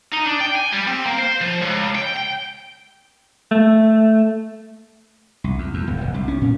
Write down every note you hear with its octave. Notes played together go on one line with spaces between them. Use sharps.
D#4
D4
G5
G#5
G3
C4
A#3
C5
F3
C#2
G5
G5
A3
C2
E2
E2
D1
F1
C2
C#4
A2